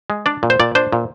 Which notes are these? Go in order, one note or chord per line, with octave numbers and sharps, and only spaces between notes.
G#3
D4 D5
A#2
C5
A#2 D5
D4 C5
A#2